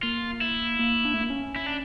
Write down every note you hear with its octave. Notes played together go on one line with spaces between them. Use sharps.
A#3 F4
E4
A#3
D4
A3
A#3
C#4
E4
D4